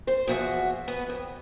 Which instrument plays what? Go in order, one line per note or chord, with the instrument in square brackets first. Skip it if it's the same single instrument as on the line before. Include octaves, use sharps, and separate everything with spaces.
[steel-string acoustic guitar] C5
E2 F3 F#4 A#4 E5 F#5
B3 B4
F2